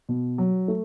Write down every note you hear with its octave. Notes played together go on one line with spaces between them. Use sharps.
B2
F#3
A3